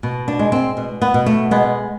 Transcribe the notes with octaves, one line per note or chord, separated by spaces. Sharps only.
B2
D4
G#3
C4
B2
B3
B2
A3
G#3 B3